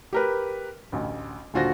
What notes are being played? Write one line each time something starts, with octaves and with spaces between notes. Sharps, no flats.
G4 A#4 B4
A1 D2
D#1 D3 F4 F#4 C5 A#6